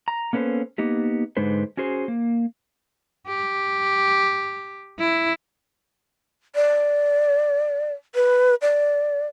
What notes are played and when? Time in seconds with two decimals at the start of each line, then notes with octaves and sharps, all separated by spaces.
0.08 A#5
0.33 A#3 B3 C#4 A4 B4 C5
0.78 A#3 B3 D#4 G4
1.37 G#2 D3 G#3 D#4 B4 C5
1.77 C#4 F#4 G#4 C5
2.08 A#3
3.28 G4
4.99 E4
6.55 D5
8.15 B4
8.62 D5